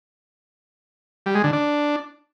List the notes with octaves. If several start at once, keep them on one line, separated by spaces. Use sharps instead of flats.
G3
G#3
D3
D4